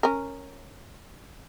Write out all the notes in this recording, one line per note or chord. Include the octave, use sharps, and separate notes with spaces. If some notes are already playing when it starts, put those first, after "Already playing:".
C#4 A#4